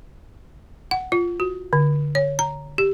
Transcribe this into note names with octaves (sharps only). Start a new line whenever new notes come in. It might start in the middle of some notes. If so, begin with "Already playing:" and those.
F#5
F4
F#4
D3
C#5
A#5
G4